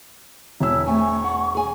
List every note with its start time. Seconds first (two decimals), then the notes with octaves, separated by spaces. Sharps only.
0.60 E1 E4 E6
0.86 A3 C4 G#5 C#6
1.24 F#5
1.55 G#4 G#5